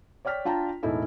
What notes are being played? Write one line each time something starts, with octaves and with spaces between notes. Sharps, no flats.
C#5 D5 G5 F6 B6
D4 F4 G5 A5 A#5
E1 A2 D#4 E4 A4